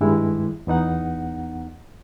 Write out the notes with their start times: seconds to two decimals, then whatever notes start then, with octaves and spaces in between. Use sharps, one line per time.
0.01 G2 D#3 G3 G#3 E4
0.67 E2 B3 D#4 F#5